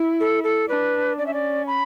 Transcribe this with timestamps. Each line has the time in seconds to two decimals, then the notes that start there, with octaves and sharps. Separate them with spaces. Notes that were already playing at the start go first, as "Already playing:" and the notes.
Already playing: E4
0.20 A4
0.44 A4
0.69 D4 B4
1.18 C#4 D5
1.27 E5
1.34 D5
1.67 B5